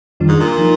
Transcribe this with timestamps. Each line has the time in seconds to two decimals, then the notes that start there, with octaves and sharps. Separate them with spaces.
0.20 F2 D#3 G3 D4 F4
0.28 G#2
0.40 A#2
0.58 F3 A#3 D#4